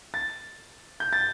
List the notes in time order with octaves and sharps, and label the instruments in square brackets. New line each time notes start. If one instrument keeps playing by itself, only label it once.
[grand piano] A6
G6
A6